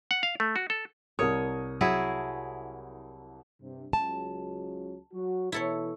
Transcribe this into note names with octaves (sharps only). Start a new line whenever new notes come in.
F#5
F5
A3
F#4
A4
C2 A#4 C#5 D#6
F#3 E4 G#4
G2 C3
C#2 C#3 F#3 A5
F#3 F#4
B2 E3 E4 A4 C#5